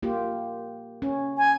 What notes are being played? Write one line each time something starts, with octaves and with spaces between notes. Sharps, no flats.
A#3 F4 G4
C#4
G#5